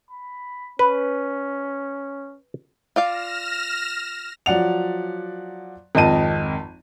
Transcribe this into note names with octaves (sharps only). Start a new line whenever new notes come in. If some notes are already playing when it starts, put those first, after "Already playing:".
B5
C#4 B4
F4 D5 F5 F6 A#6 E7
F3 F#3 D5 F#5 F7
G#1 F2 D#5 A5 D#7